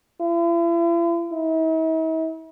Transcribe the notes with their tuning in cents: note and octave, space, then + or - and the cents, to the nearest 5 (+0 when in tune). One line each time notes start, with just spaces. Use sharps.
E4 +45
E4 -45